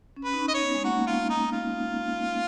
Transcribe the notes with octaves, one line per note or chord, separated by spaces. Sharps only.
C#4
B4
D#4
C#4
D#5
C#4 C#5
B3
G#3
A#3 F#4
F4
D#4
F4